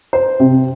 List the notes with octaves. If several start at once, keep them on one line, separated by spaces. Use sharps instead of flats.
C5
C3